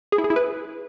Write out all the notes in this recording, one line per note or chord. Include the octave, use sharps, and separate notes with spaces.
G#4
E4
G#4
E4
B4